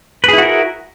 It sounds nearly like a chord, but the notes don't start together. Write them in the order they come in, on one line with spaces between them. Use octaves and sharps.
B4 G#4 E4 F#4 A#4